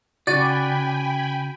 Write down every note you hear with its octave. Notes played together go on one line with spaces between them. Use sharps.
C#3 F#4 D5 G5 G#5 B5 A6 D#7